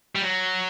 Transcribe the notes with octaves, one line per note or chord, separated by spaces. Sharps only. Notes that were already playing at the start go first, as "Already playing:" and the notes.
G3
F#3